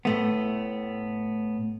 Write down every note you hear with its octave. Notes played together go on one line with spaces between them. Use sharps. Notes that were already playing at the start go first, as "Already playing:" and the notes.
A2 A3 B3